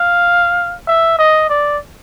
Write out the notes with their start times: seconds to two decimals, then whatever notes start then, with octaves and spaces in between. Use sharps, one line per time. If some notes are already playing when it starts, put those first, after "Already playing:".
Already playing: F5
0.87 E5
1.19 D#5
1.50 D5